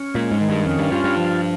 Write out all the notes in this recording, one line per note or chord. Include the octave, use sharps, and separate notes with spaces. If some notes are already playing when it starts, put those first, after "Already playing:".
Already playing: C#4
A#2 G#3
G#2
D#3
G2
F2 C#4
G2
G2 F4
G2
F3